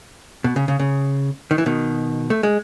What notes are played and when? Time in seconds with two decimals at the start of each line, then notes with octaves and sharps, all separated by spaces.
0.44 B2
0.56 C#3
0.68 C#3
0.80 C#3
1.51 D#3
1.58 E3
1.66 B2 D#3
2.30 A3
2.43 G#3